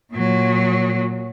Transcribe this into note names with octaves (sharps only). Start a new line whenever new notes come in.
A#2 F#3